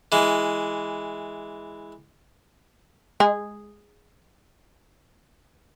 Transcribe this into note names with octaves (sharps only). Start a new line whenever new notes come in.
E3 G#3
G#3 G#4